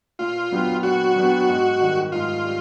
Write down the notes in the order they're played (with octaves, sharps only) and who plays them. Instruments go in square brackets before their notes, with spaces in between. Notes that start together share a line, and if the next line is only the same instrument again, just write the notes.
[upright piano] A#2 [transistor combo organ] F4
[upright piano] F#3 B3 D4 G4
[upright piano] A#2 [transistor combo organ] F#4
[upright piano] F#3 B3 D4 G4
G#2
D#3 G3
[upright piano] G#2 [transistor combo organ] F4
[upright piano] G3